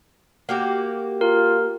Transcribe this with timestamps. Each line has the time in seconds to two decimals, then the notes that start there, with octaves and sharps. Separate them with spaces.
0.49 A#3 F#4 G4
1.21 F4 A#4